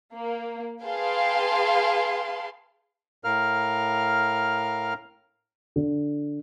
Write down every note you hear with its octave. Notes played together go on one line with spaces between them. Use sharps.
A#3
G#4 B4 F5 G5 A5 C6
A2 A#4 F5 F6
D3